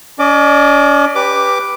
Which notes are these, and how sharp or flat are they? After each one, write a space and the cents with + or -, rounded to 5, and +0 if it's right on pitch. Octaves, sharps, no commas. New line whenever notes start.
C#4 +40 D#5 -45 D6 +0
G4 +10 B4 +0 D6 +0